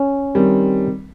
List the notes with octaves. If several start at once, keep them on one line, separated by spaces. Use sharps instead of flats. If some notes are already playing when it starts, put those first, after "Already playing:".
Already playing: C#4
D#3 G3 C4